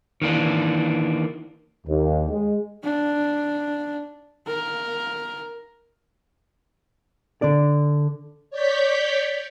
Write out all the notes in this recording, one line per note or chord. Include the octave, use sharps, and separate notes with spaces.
D#3 E3 A#3 D4
D#2
G#3
D4
A#4
D3 D4 D5
C#5 D5 G6 B6